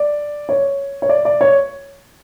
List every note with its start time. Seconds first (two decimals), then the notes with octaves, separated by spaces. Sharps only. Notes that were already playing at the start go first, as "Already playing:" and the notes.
Already playing: D5
0.49 C#5
1.02 C#5
1.09 D5
1.25 D5
1.41 C#5